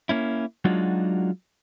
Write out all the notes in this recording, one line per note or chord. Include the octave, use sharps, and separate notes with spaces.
A#3 C#4 E4
F#3 G#3 D4 D#4 F4 F#4